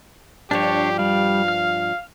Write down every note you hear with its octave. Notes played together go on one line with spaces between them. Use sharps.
G2 F3 D4 G4 C#5
G3 F5
F6